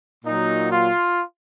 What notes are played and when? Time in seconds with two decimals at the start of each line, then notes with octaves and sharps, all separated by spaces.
0.24 A#2 F#3 D#4
0.71 F4